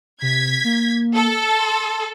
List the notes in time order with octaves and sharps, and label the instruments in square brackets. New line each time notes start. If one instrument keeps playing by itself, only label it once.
[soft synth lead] C3 [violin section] G#6 B6
[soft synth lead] A#3
[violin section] A4
[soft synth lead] C6